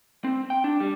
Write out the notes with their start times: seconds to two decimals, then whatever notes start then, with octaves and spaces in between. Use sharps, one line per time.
0.24 C4
0.50 G5
0.64 D4
0.80 G3